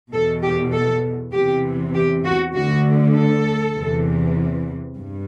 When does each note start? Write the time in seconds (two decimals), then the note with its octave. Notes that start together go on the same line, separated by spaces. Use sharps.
0.12 E2 B2 A4
0.43 G4
0.73 A4
1.33 E2 C3 E3 G4
1.94 G4
2.25 F#4
2.54 D2 D3 F#4
3.14 A4
3.76 E2 C3 E3
4.96 G2